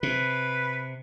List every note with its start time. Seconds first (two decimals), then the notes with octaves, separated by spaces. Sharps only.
0.03 C3 B4